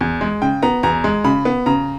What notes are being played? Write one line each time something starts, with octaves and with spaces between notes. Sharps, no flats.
E2
G#3
C#3 G5
B3 A#5
E2 A#5
G#3
C#3 B5
B3
C#3 A#5